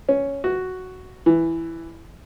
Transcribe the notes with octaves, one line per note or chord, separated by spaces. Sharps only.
C#4
F#4
E3